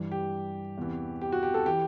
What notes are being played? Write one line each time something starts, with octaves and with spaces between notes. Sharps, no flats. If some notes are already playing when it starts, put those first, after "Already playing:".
Already playing: G2 E3
G4
E2 C3 E3
G4
F#4
G4
A4
E3 G4